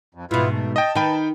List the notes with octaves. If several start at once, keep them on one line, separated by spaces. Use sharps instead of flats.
F2
G#2 B2 B3 E4 F4
A3
D#5 G5 A5
D#3 D#4 B4 G5 B5